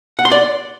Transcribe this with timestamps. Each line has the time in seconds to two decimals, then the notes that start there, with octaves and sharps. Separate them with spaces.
0.19 F#5
0.25 C6
0.32 D5